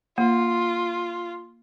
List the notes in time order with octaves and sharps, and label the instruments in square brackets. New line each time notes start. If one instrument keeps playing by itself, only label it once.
[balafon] A#3 [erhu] F4